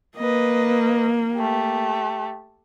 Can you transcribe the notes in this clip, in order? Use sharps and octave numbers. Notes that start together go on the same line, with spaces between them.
A#3 B4 D#5
A3 G4